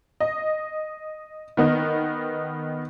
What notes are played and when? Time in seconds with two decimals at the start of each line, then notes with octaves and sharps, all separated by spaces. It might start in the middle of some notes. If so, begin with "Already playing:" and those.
0.20 D#5
1.57 D#3 B3 D#4